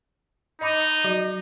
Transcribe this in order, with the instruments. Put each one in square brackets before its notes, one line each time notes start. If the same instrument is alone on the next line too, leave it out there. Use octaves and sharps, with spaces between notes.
[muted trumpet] D#4 [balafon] D#5 B5 D6
[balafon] F#3 F#4 D#5